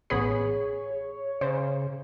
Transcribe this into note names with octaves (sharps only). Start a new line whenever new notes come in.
A1 B3 G#4 C#5 B5
C#3 C5